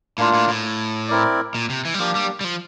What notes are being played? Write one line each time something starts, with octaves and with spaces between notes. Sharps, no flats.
A2 A#3 D4 F4
A2
A2
C4 E4 A#4 D5
A#2
C3
E3
G3
F3 A#3 D4 G4
G3
G3
F3